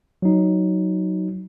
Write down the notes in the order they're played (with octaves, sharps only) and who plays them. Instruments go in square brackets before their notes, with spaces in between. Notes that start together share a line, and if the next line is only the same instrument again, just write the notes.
[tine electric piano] F#3 D#4